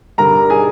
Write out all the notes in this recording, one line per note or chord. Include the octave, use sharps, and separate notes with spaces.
G2 D3 G3 A#4 A#5
G#4 G#5